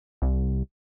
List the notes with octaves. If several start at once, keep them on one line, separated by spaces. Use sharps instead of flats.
C2